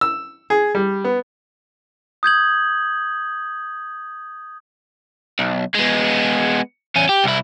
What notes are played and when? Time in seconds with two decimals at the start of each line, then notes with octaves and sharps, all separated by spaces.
0.01 E6
0.50 G#4
0.75 G3
1.04 B3
2.23 D#6 G6 G#6 F#7
5.39 B1
5.74 G#3 B3
6.96 E2 C#4
7.09 G4
7.24 C2 E4